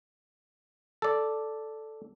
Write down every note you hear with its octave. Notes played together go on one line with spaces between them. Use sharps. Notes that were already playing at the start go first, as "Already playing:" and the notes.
A4 D5